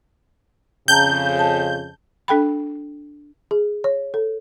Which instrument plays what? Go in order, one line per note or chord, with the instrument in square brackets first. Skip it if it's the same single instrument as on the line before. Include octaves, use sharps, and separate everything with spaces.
[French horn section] F2 C#3 [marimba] G5 A5 A#5 [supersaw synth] G6
[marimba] A5
[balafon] D4 A4 G5 B5
G#4
C#5
A4